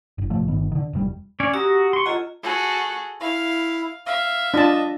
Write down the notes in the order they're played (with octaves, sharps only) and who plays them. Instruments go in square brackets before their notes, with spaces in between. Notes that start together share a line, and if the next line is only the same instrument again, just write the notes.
[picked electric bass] F#1
A1 C3 F3 A3
G1 D#3 B3
D3 D#3
F1 B2 G3
[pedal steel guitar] C#4 C#5 D5
[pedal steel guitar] F#4 A#5 [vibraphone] G4 D#6 E6
[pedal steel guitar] C6 C#6
[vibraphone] F4 D#5 A#5 [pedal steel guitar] A4 C#5 F#5
[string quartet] F#4 G#4 A4
[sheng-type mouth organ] E4 [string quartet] F5
[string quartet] E5 [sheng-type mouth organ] F5
[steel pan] D4 F4 A5 [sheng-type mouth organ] D#5